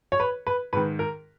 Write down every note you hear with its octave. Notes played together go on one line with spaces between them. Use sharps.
C#5
B4
B4
G#2 D#3 B4
A#4